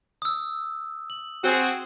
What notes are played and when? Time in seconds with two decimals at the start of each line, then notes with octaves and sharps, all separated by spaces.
0.22 D#6 E6
1.10 F#7
1.44 C4 F#4 G#4